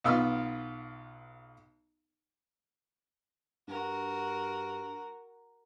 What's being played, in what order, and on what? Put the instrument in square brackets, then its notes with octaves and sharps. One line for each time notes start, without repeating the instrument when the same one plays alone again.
[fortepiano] B1 B3 F4 E6 F6
[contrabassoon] G2 [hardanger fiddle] F#4 A#4